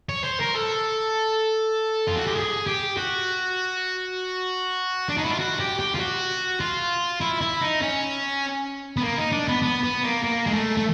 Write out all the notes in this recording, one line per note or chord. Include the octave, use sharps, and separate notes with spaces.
C#5
C5
A#4
A4
F4
F#4
G4
G#4
G4
F#4
D4
D#4
E4
F4
F#4
G4
G4
F4
F#4
F4
E4
E4
D#4
C#4
B3
A#3
D#4
D4
B3
B3
B3
A#3
A#3
G#3
A3
A3